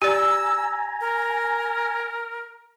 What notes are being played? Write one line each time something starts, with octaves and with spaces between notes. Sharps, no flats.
G4 D5 G#5 A#5 E6
A#4